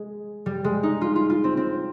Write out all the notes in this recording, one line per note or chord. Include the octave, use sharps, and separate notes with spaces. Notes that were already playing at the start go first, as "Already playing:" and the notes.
Already playing: G#3
G3
G#3
D#4
F4
F4
F4
C4
C4